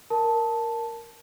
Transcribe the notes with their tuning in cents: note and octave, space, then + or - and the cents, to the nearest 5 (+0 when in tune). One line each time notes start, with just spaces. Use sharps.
A#4 +0 A5 +0